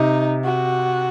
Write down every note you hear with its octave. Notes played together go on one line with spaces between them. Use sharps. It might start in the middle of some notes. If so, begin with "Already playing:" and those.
Already playing: C3 D#4
F#4